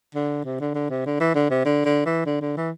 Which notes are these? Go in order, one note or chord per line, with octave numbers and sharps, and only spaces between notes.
D3
C3
D3
D3
C3
D3
E3
D3
C3
D3
D3
E3
D3
D3
E3